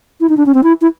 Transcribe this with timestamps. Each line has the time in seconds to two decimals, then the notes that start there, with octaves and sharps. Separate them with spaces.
0.20 E4
0.29 D#4
0.37 D4
0.46 C#4
0.54 C4
0.63 E4
0.81 E4